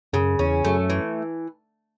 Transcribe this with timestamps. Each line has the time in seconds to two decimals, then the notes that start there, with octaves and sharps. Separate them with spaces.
0.13 F#2 C#3
0.39 E2 C#4
0.65 F#2 A3
0.90 E3